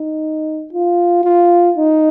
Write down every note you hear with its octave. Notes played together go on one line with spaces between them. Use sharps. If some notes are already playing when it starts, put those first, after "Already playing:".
Already playing: D#4
F4
F4
D#4